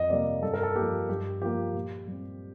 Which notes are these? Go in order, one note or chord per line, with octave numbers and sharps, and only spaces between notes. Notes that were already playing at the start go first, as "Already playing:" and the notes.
Already playing: F2 D#5
C3 G3 A#3 D5
G2 A4
A#4
A4
F3 A#3 G4
G2 G4
F3 A#3 G4
A#2
G3 C4